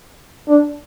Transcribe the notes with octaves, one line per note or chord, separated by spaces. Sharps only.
D4